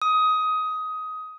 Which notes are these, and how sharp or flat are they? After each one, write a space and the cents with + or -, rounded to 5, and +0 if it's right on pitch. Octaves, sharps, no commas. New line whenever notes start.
D#6 +15